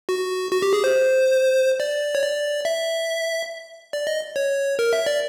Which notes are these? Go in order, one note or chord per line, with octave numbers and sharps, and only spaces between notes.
F#4
F#4
G4
G#4
C5
D5
C#5
D5
E5
D5
D#5
C#5
A#4
E5
D5